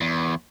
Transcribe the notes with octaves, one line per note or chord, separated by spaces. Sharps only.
E2